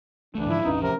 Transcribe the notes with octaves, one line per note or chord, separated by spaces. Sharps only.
C#2 E3 A3 D4
G#2 D3 F3 E4
A1 E2 G2 C#4 D#4
C3 F3 A#4